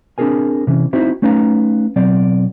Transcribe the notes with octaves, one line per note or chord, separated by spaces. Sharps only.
C4 D4 F#4 G#4 A#4 G#5
C3 E3 C#4
C4 D#4 E4 F#4 C5
A3 C#4 D#4 B4 F5 A#5
B2 F#3 C4 D5